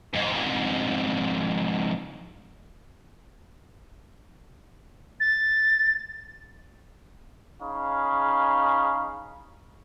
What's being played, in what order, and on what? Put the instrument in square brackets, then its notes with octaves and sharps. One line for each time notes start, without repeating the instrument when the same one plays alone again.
[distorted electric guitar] F2 G#2
[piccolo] A6
[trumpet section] C#4 D#4 G#4 F5 B5 C#6